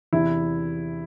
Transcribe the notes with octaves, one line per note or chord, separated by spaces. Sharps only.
E2 C3 E3 E4